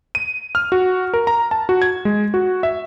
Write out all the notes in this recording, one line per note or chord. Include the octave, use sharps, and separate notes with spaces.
D#7
F6
F#4
A#4
A#5
A5
F#4
G#6
G#3
F#4
E5